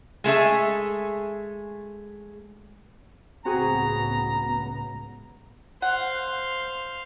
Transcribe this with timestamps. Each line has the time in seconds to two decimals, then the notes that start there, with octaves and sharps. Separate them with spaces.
0.24 G#3 A3 G#4 E5
3.45 C#2 A2 B3 C4 F#4 G#4 A#5
5.82 C5 F5 F#5